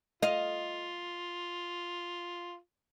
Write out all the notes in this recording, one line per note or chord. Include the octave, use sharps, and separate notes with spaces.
F4 D#5 F5